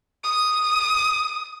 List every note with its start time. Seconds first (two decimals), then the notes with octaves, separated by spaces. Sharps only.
0.24 D#6